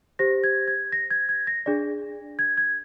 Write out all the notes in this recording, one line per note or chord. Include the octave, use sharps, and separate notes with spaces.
G4 C5 A#6
G#6
G#6
A#6
G#6
G#6
A#6
D4 G#4 D5
G#6
G#6